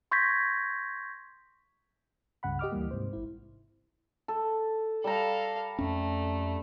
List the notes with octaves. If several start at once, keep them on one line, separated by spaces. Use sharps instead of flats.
C6 C#6 G6 G#6 A#6 B6
C#2 G2 C#3 F#5 B5
G4 D#5 D6 F6
D2 E3 G3 A#3
G#2 C3 C5
A1 E4
A4
G3 A4 F5 A#5
F2 A3 C#4